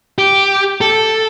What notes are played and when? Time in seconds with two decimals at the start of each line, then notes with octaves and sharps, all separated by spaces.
0.19 G4
0.81 A4